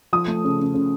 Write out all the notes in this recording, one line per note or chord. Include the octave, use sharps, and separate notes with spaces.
F3 D#6
A3
C#3
C#3
C#3